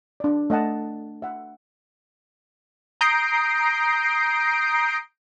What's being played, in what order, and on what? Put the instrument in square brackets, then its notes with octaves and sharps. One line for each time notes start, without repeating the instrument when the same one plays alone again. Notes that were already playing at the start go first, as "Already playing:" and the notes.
[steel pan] D4 D5
A3 D#5 F#5 A5
E5 F#5
[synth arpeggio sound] A#5 D#6 G6 A#6 C7 D7